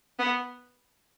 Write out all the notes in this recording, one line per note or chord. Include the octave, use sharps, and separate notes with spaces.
B3